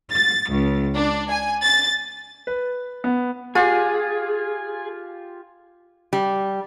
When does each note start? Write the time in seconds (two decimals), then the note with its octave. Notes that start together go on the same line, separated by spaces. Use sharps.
0.12 A6
0.48 C#2
0.95 D4
1.30 G#5
1.63 A6
2.47 B4
3.04 B3
3.55 F4 G4 G#4
6.13 G3